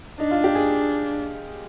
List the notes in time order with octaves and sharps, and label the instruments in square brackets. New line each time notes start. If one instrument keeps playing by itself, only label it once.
[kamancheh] D4 [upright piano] D#4
[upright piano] F4
G4
G#4